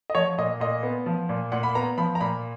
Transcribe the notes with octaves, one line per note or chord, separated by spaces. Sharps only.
D#5
F3 C#5
A#2 D#5
A#2 D#5
B3
F3
A#2
A#2 F#5
B5
B3 A#5
F3 B5
A#5
A#2 B5